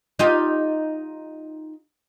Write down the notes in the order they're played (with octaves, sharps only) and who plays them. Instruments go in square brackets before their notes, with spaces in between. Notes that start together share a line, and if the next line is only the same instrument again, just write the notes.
[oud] D#4 F4 G4